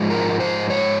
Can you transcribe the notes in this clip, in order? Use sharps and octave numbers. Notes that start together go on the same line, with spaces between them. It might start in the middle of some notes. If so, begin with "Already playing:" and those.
Already playing: G#2 F3 G#3
A#4
C5
C#5